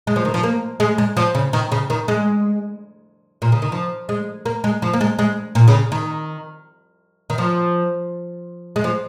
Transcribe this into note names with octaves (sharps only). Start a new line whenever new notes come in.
G#3
F3
D#3
F3
A#3
G#3
G#3
F3
C#3
D#3
C#3
D#3
G#3
A#2
C#3
D#3
F3
G#3
A#3
G#3
F3
A#3
G#3
G#3
A#2
C#3
D#3
D#3
F3
G#3
F3